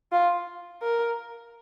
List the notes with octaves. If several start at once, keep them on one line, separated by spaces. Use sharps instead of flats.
F4
A#4